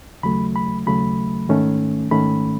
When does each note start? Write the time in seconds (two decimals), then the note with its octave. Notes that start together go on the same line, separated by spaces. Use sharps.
0.23 D#2 C#3 F#3 A3 B5
0.56 B5
0.86 D#2 C#3 F#3 A3 B5
1.49 G#2 D#3 A3 C#4
2.11 G#2 D#3 A3 C#4 B5